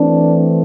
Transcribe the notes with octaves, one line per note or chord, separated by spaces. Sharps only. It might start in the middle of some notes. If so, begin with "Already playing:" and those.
Already playing: E3 A3 C4 D4